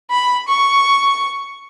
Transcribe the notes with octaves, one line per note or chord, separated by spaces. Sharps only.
B5
C#6